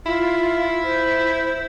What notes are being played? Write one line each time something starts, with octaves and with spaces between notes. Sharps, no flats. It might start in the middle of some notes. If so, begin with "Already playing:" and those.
E4 F4
C5